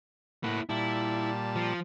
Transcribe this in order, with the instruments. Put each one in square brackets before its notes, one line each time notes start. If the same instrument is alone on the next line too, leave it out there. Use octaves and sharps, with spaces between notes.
[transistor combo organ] A2 F#5 B5 [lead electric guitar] A#3 E4
[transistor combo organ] A#2 G3 A5 [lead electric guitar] E4
[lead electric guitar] F3